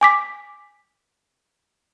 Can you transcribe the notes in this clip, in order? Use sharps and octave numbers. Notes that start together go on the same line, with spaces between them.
G#5 D6 B6